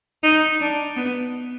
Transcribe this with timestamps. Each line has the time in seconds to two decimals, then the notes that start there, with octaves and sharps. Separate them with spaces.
0.23 D#4
0.60 D4
0.96 B3